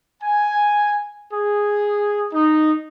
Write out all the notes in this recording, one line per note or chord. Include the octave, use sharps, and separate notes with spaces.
G#5
G#4
D#4